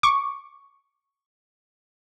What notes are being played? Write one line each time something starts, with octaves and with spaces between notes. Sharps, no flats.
C#6 D6